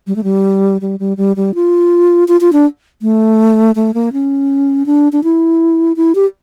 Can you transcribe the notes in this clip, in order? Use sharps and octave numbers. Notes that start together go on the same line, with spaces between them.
G3
A3
G3
G3
G3
G3
G3
F4
F4
F4
D4
A3
A3
A#3
C#4
D4
D4
E4
E4
G4